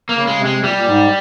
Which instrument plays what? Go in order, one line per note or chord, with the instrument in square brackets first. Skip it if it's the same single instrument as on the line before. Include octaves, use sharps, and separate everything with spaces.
[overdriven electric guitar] A#3
[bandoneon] C#3
[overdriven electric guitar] G#3
[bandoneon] C3
[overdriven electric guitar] G#3
[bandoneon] A#2 [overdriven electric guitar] G3
[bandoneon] A#2
G#2